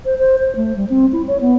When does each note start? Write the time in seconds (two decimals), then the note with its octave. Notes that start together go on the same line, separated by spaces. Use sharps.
0.05 C5
0.18 C5
0.39 C5
0.56 A3
0.76 G3
0.90 C4
1.12 E4
1.27 C#5
1.41 B3